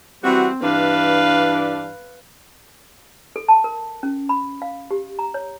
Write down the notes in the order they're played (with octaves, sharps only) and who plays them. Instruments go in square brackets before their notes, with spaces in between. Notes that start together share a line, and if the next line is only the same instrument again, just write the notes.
[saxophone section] E3 G3 F#4 [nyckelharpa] C4
[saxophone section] G2 E3 D4 [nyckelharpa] B4 F5
[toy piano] A4
A5
A#4
C#4
B5
F5
G4
A#5
C#5